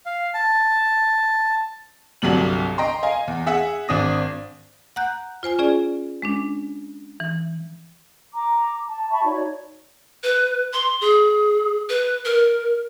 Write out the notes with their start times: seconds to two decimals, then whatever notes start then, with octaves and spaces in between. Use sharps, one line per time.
0.06 F5
0.34 A5
2.22 G1 C2 F#3 G3 F#7
2.78 D#5 G5 A#5 C6
3.03 D#5 F5 G#5
3.28 E2
3.46 G#4 E5 F#5
3.88 G#1 D4 D#6 A#6
4.96 F#5 A#5 F#6 G6
5.43 F4 C5 G#5 F6
5.59 C#4 F4 G#4 D5
6.22 G#3 C#4 D4
7.20 E3
8.34 A#5 D6
8.89 A5
9.10 E5 A5 B5 C#6
9.25 D#4 F#4 C#5 D5
10.23 B4
10.73 C6
11.01 G#4
11.89 B4
12.25 A#4